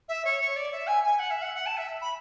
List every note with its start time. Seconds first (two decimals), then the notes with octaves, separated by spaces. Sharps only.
0.08 E5
0.25 C#5
0.41 C#5
0.56 D5
0.72 E5
0.87 G#5
1.03 G#5
1.19 F#5
1.30 E5
1.42 F#5
1.54 F#5
1.66 A5
1.77 E5
2.01 B5